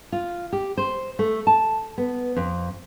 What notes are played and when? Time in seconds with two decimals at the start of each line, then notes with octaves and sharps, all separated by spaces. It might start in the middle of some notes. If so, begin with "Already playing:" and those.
0.12 F4
0.53 G4
0.77 C5
1.19 A3
1.47 A5
1.98 B3
2.36 F2